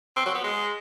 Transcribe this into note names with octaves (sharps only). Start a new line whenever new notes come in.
C4
F#3
B3
G#3